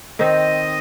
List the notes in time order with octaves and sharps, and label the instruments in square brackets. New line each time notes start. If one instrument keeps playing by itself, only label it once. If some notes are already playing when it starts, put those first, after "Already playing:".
[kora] D#3 C4 D#4 C5 [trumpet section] D#5